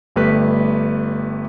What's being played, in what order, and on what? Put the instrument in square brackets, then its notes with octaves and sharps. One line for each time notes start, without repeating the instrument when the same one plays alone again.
[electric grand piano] G1 G3 A3 B4 B6